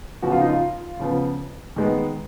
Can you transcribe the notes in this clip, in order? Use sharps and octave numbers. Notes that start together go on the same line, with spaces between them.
C#3 F3 B3 F#4
F4
D#4
F4
C#3 F3 B3
D#3 G#3 B3